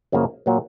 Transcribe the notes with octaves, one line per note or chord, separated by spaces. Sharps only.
F#2 C#3 F3 A#3
A#2 F#3 A#3